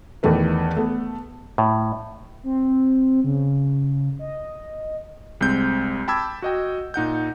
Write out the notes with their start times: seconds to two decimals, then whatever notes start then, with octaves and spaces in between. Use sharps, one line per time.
0.23 E2 D#3 E3 A3 B4
0.77 A3 B3
1.58 A2
2.44 C4
3.24 C#3
4.19 D#5
5.41 C2 G#3 C4 G6
6.08 G5 A5 B5 D6 E6 G#6
6.42 F#4 D#5 G5
6.94 A#2 D#4 F#5 G6